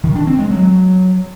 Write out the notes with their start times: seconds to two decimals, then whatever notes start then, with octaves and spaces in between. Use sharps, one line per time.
0.04 D#3
0.15 D4
0.27 C4
0.39 G#3
0.51 F#3